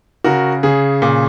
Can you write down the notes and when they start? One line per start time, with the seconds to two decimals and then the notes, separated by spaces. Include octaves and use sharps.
0.24 C#3 F#4 A#4
0.63 C#3 G#4
1.02 A#2